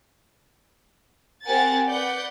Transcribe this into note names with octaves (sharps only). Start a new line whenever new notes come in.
C4 G4 A#4 F#5 G#5 A6
B4 D5 F#5 G6